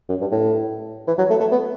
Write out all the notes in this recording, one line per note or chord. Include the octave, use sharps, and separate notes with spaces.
F#2
G2
A2
E3
F#3
A3
A3
B3